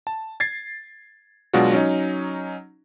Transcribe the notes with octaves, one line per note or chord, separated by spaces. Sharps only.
A5
G#6 A6 C7
B2 F#3 G#3 D4 F4 F#4
F#3 C#4 D#4